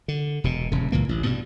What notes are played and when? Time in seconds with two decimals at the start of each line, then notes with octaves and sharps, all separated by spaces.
0.08 D3
0.44 E1 B2
0.72 D#1 C#3
0.92 C#2 A#2 E3 A#3
1.09 A1
1.24 G2 B2